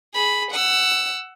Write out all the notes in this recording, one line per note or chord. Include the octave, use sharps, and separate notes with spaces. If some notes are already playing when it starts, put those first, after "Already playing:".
G#4 B5
F#5 E6